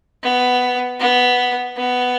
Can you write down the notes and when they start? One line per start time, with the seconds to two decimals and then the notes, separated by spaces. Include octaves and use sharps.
0.23 B3
1.00 B3
1.76 B3